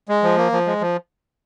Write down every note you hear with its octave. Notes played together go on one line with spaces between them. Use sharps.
G#3
F3
A#3
F3
G#3
F3